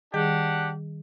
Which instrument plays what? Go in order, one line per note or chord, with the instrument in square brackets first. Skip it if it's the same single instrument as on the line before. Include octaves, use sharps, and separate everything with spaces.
[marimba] D#3 G3 G#4 [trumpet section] D4 G4 F#5